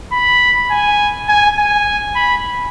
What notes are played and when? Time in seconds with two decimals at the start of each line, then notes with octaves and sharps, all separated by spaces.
0.12 B5
0.71 G#5
1.29 G#5
1.58 G#5
2.15 B5